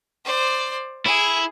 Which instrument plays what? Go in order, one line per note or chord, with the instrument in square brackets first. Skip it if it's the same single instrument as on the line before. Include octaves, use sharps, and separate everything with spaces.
[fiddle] C5 D5
[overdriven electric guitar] E4 [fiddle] G#4